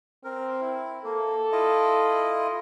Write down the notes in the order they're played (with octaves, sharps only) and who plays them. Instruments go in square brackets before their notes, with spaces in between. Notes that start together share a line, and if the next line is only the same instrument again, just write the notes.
[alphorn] C4 [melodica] A#4
[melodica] E4
[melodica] A#3 [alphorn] A4
[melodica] E4 F4 D#5